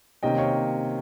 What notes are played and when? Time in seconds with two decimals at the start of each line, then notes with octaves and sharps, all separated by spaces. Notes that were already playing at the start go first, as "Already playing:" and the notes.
0.23 C3 D#3 A#3 C#4 D#5 G5
0.38 C#5 F5